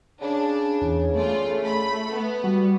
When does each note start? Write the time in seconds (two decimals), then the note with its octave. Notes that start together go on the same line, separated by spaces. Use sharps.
0.21 C#3 D4
0.82 E2
1.15 A3 F4 D5
1.64 B5
2.11 B3
2.44 G3 F#4